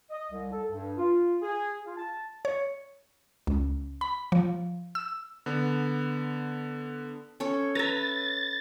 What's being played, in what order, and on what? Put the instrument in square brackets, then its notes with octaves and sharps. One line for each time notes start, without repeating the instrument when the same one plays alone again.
[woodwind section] D#5
C2
A4
G2
F4
G#4
F4
A5
[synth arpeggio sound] C#5
C#2
B5
F3
E6
[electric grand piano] D3 B3
[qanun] C#4 A4 C#5
[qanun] B4 E5 [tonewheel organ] A#5 A6
[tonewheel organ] A6